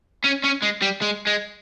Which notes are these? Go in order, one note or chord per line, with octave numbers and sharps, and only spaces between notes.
C#4
C#4
G#3
G3
G#3
G#3